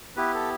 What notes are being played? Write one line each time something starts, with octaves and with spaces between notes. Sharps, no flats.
B3 E4 G4 B4
A4